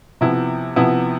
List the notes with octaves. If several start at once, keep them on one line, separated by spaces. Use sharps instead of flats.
C3 F3 B3 E4
C3 F3 B3 E4